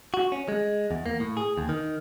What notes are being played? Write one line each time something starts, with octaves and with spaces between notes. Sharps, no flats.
F#4
C#4
G#3
E2
A#3
A2
G#4
D#2
D#3